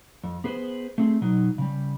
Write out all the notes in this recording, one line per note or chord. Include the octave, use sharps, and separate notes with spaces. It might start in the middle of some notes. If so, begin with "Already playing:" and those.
F2
B3 G#4 B4 C5
A3 C4 G#4
B2 F#3 D#4
C#3 G3